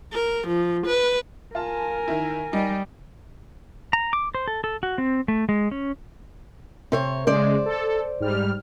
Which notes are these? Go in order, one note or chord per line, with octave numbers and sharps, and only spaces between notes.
A#4
F3
B4
F4 A#4 G#5 A5
D#3 E4
G3 D#4
A#5
D6
C5
A4
A4
F#4
C4
A3
G#3
C#4
C3 C5 C#5
C#3 G#3 C5 D5
A4
G#2 G3 F6